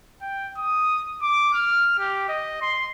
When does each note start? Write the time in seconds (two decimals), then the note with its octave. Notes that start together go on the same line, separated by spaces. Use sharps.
0.21 G5
0.57 D#6
1.22 D6
1.54 F6
1.98 G4
2.29 D#5
2.62 C6